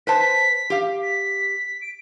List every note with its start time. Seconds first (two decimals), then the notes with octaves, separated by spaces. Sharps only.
0.07 B4 C5 A5 B6
0.70 G4 F5
1.02 B6
1.81 D7